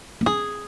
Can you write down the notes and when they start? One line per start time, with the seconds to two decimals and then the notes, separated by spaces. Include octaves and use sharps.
0.21 A#3
0.26 C4 G#4